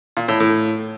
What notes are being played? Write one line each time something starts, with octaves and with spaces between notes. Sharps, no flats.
A#2
A2
A2